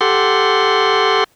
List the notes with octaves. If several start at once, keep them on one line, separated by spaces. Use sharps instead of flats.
G4 A4 F#5 C6